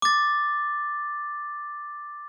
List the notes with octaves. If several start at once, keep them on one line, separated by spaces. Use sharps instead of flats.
D6 A6